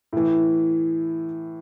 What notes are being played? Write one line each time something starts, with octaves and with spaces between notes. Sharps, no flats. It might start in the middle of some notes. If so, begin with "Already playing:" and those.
A2 E3